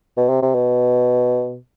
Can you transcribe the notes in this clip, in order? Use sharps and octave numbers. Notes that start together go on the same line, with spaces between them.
B2
C3
C3
B2